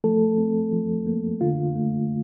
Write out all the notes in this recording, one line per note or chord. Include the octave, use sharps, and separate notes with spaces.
F3 A3 A4
C4
F3
A#3
D3 F4
A3